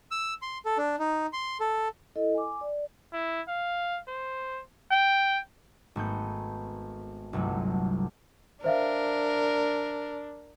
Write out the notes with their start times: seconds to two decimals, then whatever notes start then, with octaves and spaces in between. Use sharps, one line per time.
0.11 E6
0.42 C6
0.65 A4
0.78 D4
0.99 D#4
1.33 C6
1.60 A4
2.16 E4 A4 D#5
2.35 G#5 D6
2.61 D5
3.13 E4
3.48 F5
4.08 C5
4.92 G5
5.96 G#1 A3 B3 G6
7.33 G1 C2 F#3 A3
8.64 D4 A#4 C5 E5 F5